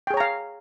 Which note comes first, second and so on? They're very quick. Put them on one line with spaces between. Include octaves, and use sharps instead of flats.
G5 G#4 C#5 A#5 F5